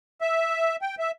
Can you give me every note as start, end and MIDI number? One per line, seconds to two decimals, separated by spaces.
0.21 0.76 76
0.82 0.95 79
0.99 1.11 76